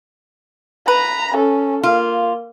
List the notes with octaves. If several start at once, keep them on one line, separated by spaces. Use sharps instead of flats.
B4 A#5 B5
C#4 A4
A#3 F4